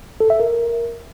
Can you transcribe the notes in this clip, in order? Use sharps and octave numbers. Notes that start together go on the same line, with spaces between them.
A4
E5
A#4